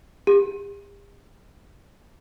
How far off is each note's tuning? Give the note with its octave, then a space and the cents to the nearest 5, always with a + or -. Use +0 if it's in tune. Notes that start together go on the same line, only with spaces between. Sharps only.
G4 +45